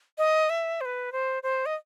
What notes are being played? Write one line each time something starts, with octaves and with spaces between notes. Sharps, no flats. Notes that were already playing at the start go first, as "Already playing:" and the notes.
D#5
E5
C5
B4
C5
C5
D#5